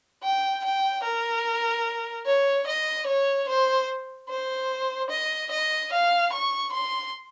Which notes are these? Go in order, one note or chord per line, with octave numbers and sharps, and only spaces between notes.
G5
G5
A#4
C#5
D#5
C#5
C5
C5
D#5
D#5
F5
C#6
C6